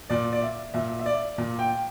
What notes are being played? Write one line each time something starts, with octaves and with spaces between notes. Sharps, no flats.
A#2 D5
D5
E5
A#2 E5
E5
D5
A#2
G5